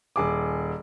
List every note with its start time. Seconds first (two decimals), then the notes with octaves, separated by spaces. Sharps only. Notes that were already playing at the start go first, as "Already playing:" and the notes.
0.16 D#1 G#4 D6